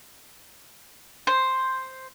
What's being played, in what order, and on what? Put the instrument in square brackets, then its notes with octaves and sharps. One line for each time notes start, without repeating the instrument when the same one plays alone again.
[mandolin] C5